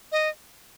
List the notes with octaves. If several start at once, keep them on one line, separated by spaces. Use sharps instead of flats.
D#5